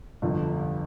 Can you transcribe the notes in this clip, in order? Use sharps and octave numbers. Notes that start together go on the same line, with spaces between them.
G1 F2 D3 F3